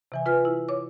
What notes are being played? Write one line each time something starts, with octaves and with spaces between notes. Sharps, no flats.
C3 E3 G#5
F4 B4 G#5 F6
E4
C#5 D6